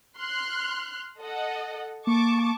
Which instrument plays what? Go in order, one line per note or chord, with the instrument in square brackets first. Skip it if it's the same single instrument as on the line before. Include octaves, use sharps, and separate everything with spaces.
[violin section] C6 F6 F#6
A4 D#5 F#5
[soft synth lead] A#3 [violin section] A5 C#6 D6